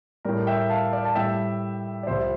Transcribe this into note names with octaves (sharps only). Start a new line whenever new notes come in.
A2 G3 A#4 D5
E5 G5
F5 A5
D5 F5
A5
A2 G3 E5 G5
D5
C2 C3 F3 C5 E5